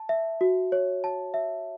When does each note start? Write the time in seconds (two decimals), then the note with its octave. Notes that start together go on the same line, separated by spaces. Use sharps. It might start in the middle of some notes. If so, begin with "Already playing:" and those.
Already playing: A5
0.09 E5
0.41 F#4
0.72 C#5
1.04 A5
1.34 E5